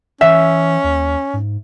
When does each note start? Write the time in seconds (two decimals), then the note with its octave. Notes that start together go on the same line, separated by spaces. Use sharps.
0.21 E3 C#4 E5
0.84 D#2
1.33 G#2